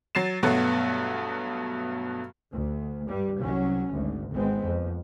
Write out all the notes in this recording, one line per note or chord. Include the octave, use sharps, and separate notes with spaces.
F#3 A6 C7 E7
G2 B2 F#3 A3 B3 F#4
D2
G2 G3
C2 F#3 C#4
G#1 D2
G#1 G#3 B3 C4
F2